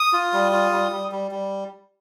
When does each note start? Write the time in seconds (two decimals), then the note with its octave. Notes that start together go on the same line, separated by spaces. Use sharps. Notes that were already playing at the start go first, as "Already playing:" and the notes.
Already playing: D#6
0.13 F4
0.33 G3
0.53 F4
0.72 G3
0.92 G3
1.12 G3
1.31 G3